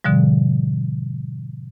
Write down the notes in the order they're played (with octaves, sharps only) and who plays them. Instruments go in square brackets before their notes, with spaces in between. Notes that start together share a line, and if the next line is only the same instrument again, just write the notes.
[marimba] G#2 B2 D3 F3 G3